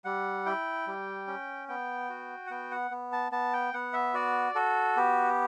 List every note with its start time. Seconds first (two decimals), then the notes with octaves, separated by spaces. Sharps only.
0.05 G3 F#5
0.46 E4 G5
0.87 G3
1.27 C#4
1.69 B3 G5
2.09 F#4
2.47 F#5
2.51 B3 G5
2.71 F#5
2.91 B3
3.12 A5
3.32 B3 A5
3.53 G5
3.74 B3 F#5
3.93 E5
4.14 F#4 D5
4.55 F#4 A4
4.97 B3 G4